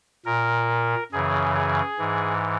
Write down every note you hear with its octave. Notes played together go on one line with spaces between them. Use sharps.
A#2 A#4
F#2 C#3 E3 G#4
G#4
G#2 E3